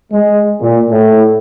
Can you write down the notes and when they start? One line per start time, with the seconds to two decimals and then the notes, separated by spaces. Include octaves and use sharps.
0.12 G#3
0.61 A#2
0.90 A2